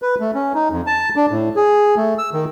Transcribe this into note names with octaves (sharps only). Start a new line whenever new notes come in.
B4
A3
C#4
D#4
F2
A5
D4
A2
G#4
A3
E6
D#3